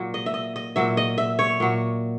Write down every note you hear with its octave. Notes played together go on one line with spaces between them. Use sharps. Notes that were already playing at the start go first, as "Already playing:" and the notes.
Already playing: A#2 F#3
D#5
E5
D#5
D#5
A#2 F#3 E5
D#5
E5
C#5
A#2 F#3